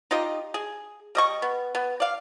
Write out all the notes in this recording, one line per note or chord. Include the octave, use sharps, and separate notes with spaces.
D#4 F4 G4 D#5
G#4
G3 D#5 C#6
B3
B3
D5 F5